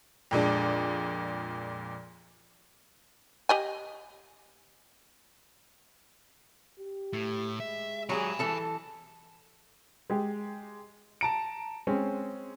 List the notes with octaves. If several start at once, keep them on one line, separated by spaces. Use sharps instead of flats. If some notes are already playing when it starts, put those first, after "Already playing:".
F2 A#2 G#3 D4
G4 D#5 G#5
G4
A2
G#3 E5
F#3 G4 G#4 G#5 B5
E3 A4 A5
G#3 G4
A5 A#5 D7
G#3 C4 C#4